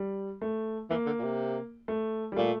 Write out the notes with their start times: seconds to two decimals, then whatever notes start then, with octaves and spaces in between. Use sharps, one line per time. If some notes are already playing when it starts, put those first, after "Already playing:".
Already playing: G3
0.42 A3
0.90 E3 A#3
1.06 D3
1.19 A#2
1.23 C3
1.88 A3
2.32 G3
2.37 A#2 A3